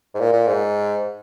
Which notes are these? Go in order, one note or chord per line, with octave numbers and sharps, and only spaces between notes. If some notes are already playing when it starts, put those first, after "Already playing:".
G#2
A#2
A#2
G#2